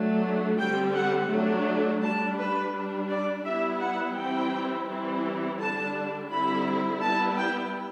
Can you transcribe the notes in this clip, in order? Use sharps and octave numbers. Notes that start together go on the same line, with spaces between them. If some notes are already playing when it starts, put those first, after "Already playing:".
Already playing: F#3 A3 D4
D3 G3 C4 G5
F#5
F#3 A3 D4
G3 D4 A5
B4
G3 D4
D5
G3 B3 E4 E5
F#5
E3 G3 C4 E4 G5
E3 G3 C4 E4
D3 G3 D4 A5
D3 G3 C4 E4 B5
G3 B3 E4 A5
G5